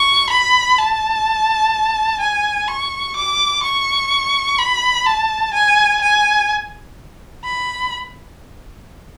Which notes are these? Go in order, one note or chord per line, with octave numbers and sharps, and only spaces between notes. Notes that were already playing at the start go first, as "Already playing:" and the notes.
Already playing: C#6
B5
A5
G#5
C#6
D6
C#6
B5
A5
G#5
G#5
B5